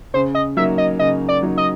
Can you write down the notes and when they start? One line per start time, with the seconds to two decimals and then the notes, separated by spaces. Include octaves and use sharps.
0.14 C#3 C5
0.35 D#5
0.57 F#3 A#3 D#4 E5
0.78 D#5
0.99 C#3 D#5
1.29 D5
1.43 F#3 A#3 D#4
1.57 D#5